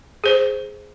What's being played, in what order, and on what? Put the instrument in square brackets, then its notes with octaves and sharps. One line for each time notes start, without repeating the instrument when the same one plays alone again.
[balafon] G#4 C5